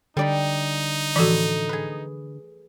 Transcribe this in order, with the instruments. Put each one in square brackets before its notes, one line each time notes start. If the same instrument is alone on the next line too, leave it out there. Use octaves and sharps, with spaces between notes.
[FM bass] D3 [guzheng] G3 D5 B5 [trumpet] D#4
[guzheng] A2 B5 [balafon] E3 F3 F#4
[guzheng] G#4 B4